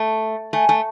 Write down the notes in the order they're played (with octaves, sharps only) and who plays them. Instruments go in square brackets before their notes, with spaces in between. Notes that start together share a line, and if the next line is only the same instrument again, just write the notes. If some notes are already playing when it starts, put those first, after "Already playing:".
Already playing: [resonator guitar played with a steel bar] A3
[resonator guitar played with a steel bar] A3 [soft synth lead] G#5
[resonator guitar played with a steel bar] A3